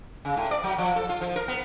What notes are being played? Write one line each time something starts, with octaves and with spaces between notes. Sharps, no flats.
C#3
A2
D5
F#3
F3
A4
F4
F3
A#4
B3